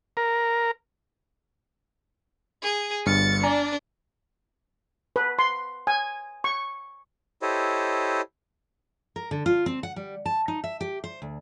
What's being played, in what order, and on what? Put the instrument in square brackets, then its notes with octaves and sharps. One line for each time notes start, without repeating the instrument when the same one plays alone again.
[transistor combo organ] A#4
[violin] G#4
[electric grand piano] G1 G2 F6 [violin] A6 C#7
[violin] D4 [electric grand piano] D5 G#5 A#5
[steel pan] B4
C6
G#5
C#6
[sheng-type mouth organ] E4 G4 A4 C5 C#5 D#5
[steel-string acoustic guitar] A#4
D3
F4
C4
F#5
G3
A5
D#4
E5
G4
C5
D2